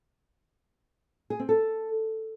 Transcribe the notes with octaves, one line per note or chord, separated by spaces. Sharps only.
G#4
C4
A4